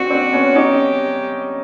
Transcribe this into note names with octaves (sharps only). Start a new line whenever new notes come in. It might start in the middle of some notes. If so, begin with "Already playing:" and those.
Already playing: C4 D4 F#4
C4 D4
B3 C#4
C#4 D#4 G4